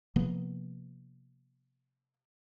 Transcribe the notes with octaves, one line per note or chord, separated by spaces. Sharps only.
C3 F3 A#3 B3